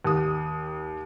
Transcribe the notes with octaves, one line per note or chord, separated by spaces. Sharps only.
D#2 D#6